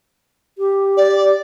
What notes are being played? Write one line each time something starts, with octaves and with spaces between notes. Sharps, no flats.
G4
D5